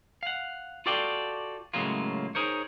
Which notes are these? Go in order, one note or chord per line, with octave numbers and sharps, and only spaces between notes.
F5 F#5
F4 F#4 A4 D5 F5 G5
A2 C#3 F#3 G#3 A#3 F4
D#4 F4 G#4 A#4 C5 C#5